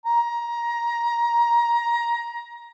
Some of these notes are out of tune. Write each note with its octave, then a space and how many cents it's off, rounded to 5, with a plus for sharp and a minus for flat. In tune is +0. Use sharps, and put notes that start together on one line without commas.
A#5 +20